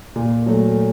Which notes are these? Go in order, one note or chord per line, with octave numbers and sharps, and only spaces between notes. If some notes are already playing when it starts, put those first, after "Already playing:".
A#2
F#3 A3